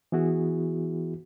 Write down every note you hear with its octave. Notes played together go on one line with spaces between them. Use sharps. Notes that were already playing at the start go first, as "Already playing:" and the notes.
E3 B3 E4 F#4 G#4